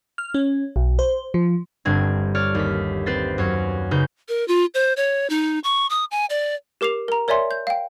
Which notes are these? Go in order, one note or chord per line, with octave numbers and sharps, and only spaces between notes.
F6
C#4
B1
C5
F3
G1 G2 C4 G#6
C#5 D5 F6
D#2 B6
C4 B4 C5 A6
F#2 C#5
C#3 D#4 B4 G6
A#4
F4
C5
C#5
D#4
C#6
D#6
G#5
D5
G4 A#4 D6 C7 F7
A#4 A#5
A#4 C#5 D5 E5 G#5 C6
G6
F5 G5